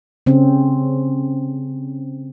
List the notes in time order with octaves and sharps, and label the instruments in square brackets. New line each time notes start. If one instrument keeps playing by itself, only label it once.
[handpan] C#3 C4 C#4